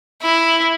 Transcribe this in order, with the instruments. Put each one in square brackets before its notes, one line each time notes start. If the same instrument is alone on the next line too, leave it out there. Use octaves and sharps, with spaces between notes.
[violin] E4